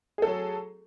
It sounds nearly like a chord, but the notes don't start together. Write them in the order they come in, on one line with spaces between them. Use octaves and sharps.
G#4 A4 F#3